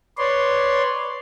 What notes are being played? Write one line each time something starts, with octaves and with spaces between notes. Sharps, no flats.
B4 C#5 D5 C6